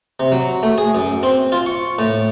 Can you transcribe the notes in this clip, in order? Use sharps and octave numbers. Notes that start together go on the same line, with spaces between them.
C3
F#3
A3
G#4
F#2
C4
F4
C#6
A2